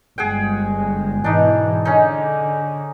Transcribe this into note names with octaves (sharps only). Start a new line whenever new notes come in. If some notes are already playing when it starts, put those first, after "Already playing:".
G1 G#3 G#4 F#5 G5
G#2 B2 E3 D4 D#4
D3 C#4 D#4